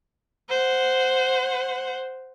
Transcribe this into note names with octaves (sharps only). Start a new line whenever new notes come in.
C5 F#5